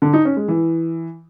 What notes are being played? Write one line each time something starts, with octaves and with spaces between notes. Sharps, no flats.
D3
D#4
C#4
G#3
E3